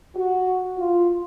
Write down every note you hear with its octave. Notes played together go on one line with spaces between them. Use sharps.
F#4
F4